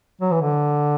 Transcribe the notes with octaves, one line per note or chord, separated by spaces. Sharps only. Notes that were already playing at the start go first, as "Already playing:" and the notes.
F#3
E3
D3